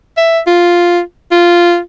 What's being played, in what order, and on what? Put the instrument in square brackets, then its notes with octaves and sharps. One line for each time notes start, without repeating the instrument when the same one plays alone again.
[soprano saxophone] E5
F4
F4